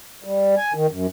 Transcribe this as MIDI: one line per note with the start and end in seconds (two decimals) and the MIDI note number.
0.24 0.55 55
0.57 0.73 80
0.74 0.87 51
0.91 1.07 42